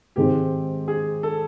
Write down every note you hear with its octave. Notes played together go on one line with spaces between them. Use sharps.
G#2 D#3 G#3 C4 G4
G#4
A4